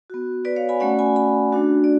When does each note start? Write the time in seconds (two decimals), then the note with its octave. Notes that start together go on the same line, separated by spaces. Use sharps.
0.10 B3 F#4
0.45 B4 D5
0.56 C#5 F5
0.69 G#5 B5
0.80 A3 C#4 F#4 D5 F#5
0.99 G#5 B5
1.16 G#5 B5
1.53 A3 D4 F#4
1.84 D5